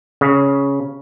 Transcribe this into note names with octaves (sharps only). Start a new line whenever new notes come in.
C#3